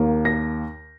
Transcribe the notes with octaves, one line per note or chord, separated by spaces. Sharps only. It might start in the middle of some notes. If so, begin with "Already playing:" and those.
Already playing: D#2 D#3 A#3
A#6